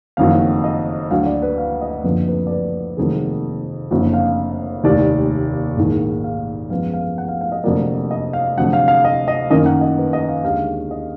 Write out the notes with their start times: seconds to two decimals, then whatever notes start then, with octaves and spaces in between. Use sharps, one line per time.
0.17 F#1 F2 D#3 F#3 F5
0.64 D#5
1.11 D2 D3 F#3 F5
1.26 D5
1.42 B4
1.58 F5
1.82 D#5
2.04 F#1 F2 D3 F3 B4
2.28 B4
2.47 D5
2.51 B4
2.97 F1 F2 D#3 F#3 A#3 G#4
3.91 F#1 F2 D3 F#4
4.14 F5
4.84 F1 D#2 D#3 D5
5.78 A#1 G#2 D#3 A#3
6.24 F5
6.70 F#2 F3 G#3 B3 F5
6.93 F5
7.18 F#5
7.28 F5
7.41 F5
7.52 D#5
7.64 F1 F2 D3 F#3 A#3 D5
8.11 D#5
8.33 F5
8.57 F1 F2 D3 F#3 F#5
8.73 F5
8.88 F5
9.04 D#5
9.28 D#5
9.50 F#2 D#3 A#3 D#5
9.66 F#5
9.81 D#5
9.98 B4
10.13 D#5
10.29 F5
10.44 D#2 D3 G#3 F5
10.91 D#5